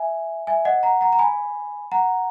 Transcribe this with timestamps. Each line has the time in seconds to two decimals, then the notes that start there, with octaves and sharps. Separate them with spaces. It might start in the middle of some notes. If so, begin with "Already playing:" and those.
Already playing: E5 G#5
0.47 E5 G#5
0.65 D#5 F#5
0.83 F#5 A#5
1.01 F#5 A#5
1.13 A#5
1.19 G#5 B5
1.92 F#5 A#5